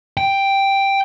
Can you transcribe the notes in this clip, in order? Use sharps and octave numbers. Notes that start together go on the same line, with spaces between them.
G5